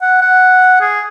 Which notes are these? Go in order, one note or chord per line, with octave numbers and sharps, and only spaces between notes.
F#5
F#5
G#4